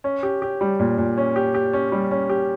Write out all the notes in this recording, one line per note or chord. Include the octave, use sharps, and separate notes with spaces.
C#4
G4
G4
G3
A#2
A#2
C#4
G4
G4
C#4
G3
C#4
G4